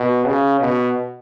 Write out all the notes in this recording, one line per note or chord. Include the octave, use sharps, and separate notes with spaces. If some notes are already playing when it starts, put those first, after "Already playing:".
Already playing: B2
C#3
B2